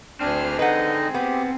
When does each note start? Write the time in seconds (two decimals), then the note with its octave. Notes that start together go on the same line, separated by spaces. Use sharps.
0.21 D2 C4 D4 G#4 F6
0.59 D3 D#4 B4 D#5 F#5
1.14 B3 G4